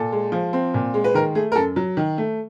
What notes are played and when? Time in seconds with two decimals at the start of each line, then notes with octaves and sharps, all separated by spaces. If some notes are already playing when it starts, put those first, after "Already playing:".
Already playing: A#2 A4
0.12 G#3
0.32 F3
0.53 C4
0.74 A#2
0.94 G#3
1.04 B4
1.14 D#3 A#4
1.35 A3 G#4
1.52 A#4
1.56 F#2 A4
1.76 F#3
1.97 D#3
2.18 A3